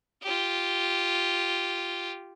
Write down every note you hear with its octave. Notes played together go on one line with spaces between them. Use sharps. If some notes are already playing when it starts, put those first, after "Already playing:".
F4 G4